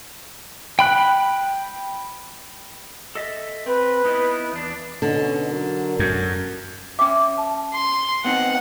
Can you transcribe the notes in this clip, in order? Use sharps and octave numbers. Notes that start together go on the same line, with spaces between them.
G5 B5 F#6
A4 D#5 E5
C4 B4
B3 D#4 E4
E2 D4
B2 D3 C#4 D#4
F#3 F#4 A#4
F#2
C#4 E5 G5 D6
A5
C6
B3 C4 D#4 F#5